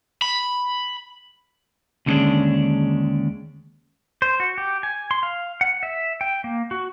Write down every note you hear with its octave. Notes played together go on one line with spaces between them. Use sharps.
B5
D#2 D3 G3 G#3 C#4 D4
C5
F#4
G4
G#5
C6
F5
F#5
E5
G5
A#3
F#4